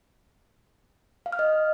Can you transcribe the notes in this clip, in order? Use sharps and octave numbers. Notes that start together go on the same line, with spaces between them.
F5
F6
D#5